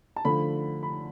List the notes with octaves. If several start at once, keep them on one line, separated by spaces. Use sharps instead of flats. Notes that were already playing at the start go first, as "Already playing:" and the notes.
A5
D3 F3 A3 B5
B5